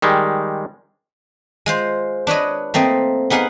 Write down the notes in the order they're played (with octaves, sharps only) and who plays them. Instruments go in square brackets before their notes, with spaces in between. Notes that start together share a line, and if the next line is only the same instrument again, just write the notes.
[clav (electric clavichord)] D#3 G3 G#3
[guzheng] G#3 F4 C5
D4 B4 C#5 D#5
A3 A#3 C4 D#5
B3 D#4 G#4 F5 F#5